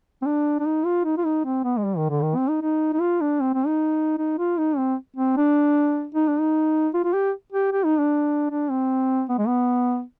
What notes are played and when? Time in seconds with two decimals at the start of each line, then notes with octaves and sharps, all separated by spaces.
0.22 C4
0.26 D4
0.60 D4
0.65 D#4
0.85 F4
1.05 D#4
1.18 F4
1.25 D#4
1.45 C4
1.64 B3
1.77 G#3
1.84 G3
1.97 D#3
2.10 D3
2.23 D#3
2.36 C4
2.49 D#4
2.62 D#4
2.93 D#4
3.01 F4
3.21 D4
3.41 C4
3.54 C4
3.67 D#4
4.18 D#4
4.38 F4
4.58 D#4
4.77 C4
5.17 C4
5.37 D4
6.15 D#4
6.28 D4
6.40 D#4
6.94 F4
7.04 F4
7.13 G4
7.52 G4
7.72 G4
7.85 D#4
7.99 D4
8.50 D4
8.70 C4
9.29 B3
9.38 G#3
9.47 B3